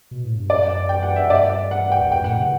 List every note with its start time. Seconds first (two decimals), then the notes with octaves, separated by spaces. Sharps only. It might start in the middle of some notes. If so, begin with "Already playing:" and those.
0.11 B2
0.24 A2
0.37 G2
0.50 F#2 D5
0.89 G5
1.03 F#5
1.16 E5
1.30 G2 D5
1.71 F#5
1.92 G5
2.01 E2
2.11 F#2 G5
2.24 A2 F#5
2.38 C#3